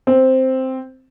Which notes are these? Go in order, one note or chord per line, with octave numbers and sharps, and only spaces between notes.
C4